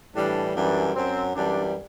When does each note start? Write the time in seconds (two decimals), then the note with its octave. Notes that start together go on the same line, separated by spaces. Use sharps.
0.15 A2 E3 G3 D4
0.55 F#2 E3 G3 D4
0.94 F#2 F#3 C4
1.34 F#2 E3 G3 D4